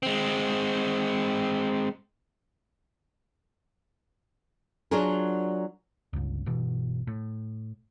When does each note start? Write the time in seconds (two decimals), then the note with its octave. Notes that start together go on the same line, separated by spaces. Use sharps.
0.03 G#3 C4
4.91 F#3 D4 F4 G#4 A#4
6.13 G1 C#2
6.46 G1 B2 E3
7.07 A2